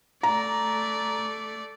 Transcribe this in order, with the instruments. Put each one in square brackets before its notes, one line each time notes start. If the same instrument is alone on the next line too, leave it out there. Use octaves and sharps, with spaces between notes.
[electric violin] A3 D5 [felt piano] A#5